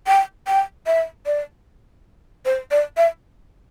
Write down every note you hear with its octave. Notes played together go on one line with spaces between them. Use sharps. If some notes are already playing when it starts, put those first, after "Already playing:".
G5
G5
E5
D5
C5
D5
E5